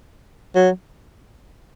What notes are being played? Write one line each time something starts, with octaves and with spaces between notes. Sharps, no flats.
F#3